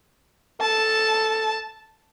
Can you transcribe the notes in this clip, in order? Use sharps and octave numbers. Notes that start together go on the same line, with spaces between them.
A4 A5